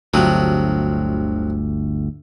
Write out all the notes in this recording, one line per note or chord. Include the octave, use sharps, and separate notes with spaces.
G1 D2 C3 F3 F#3